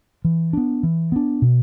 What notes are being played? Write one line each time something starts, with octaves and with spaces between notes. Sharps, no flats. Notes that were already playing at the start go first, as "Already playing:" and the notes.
E3
B3 D4
E3
B3 D4
B2